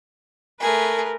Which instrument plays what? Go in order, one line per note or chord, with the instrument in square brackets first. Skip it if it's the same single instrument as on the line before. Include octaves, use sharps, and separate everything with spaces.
[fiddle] A3 G#4 [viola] A#4 B4